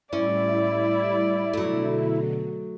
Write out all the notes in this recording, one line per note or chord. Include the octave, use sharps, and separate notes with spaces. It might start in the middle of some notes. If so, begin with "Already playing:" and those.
A2 G3 C#4 E4 D5
B2 D3 F#3 A3